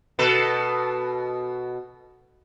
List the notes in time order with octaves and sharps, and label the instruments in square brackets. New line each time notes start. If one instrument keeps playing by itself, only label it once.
[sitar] B2 A4 B4